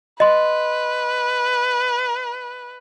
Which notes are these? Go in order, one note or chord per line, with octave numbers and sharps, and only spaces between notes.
B4 D#5 C6